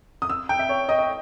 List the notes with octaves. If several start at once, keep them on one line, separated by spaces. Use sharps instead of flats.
D#6
E6
G5
E5
C#5
D#5
D#5